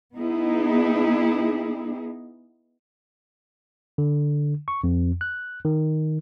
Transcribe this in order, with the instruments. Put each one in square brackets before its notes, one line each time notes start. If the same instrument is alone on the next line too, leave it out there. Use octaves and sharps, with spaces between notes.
[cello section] B3 D#4 E4 G#4
[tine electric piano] D3
C#6
F2
F#6
D#3